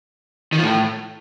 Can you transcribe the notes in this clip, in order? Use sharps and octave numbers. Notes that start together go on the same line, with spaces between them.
D#3
F3
A2